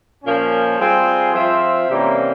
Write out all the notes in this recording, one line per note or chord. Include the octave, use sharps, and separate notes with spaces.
A#2 F3 A#3 C#4
G3 C4 F4 G#4
F3 C4 F4 C5 E5
C3 E3 G3 A#3 C#4